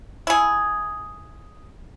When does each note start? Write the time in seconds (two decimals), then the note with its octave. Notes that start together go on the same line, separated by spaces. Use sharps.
0.27 E4 G#4